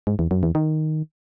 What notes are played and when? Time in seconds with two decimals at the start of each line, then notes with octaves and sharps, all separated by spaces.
0.07 G#2
0.19 E2
0.31 F#2
0.43 E2
0.55 D#3